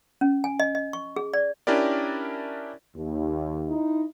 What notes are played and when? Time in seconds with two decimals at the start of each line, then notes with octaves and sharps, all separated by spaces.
0.21 C#4
0.44 G#5
0.60 D#5
0.75 D#5
0.93 C#6
1.16 G#4
1.34 D5
1.67 C#4 D4 E4 G4 A#4 D5
2.94 D#2
3.68 D#4 E4